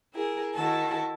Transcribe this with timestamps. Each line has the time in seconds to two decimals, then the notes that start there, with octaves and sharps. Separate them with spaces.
0.14 E4 G#4 A#4
0.55 D#3 E4 F#4 A4